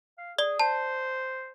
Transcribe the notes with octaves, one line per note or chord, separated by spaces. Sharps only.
F5
G#4 D5 G7
C5 A5